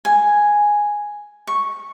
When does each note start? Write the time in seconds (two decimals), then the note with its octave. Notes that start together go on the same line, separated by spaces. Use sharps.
0.05 G#5
1.47 C#6